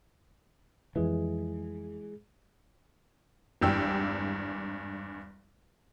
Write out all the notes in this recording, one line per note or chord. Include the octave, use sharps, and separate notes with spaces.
F2 E3 F3 G#3 G#4
G#1 E2 G2 G5 E6